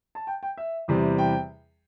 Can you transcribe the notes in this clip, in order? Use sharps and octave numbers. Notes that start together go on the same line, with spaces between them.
A5
G5
G5
E5
E2 C3 E3 G3
G5